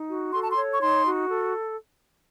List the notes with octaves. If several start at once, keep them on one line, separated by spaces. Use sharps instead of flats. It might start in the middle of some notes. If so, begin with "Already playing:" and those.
Already playing: D#4
F#4
A4 C6
A5
C6
C#5
C#6
D#4 C6
F#4
A4